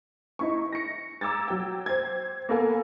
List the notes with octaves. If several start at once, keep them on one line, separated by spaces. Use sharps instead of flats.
D#4 E4 C#6
A#6 C#7
A#5 D6 E6 G#6 A6
F#3 G5
C5 G5 G#6
A#3 B3 A4 F5 G#5